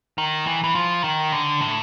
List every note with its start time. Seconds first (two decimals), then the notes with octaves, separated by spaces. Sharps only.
0.18 D#3
0.47 E3
0.64 E3
0.75 F3
1.04 D#3
1.32 D3
1.61 A2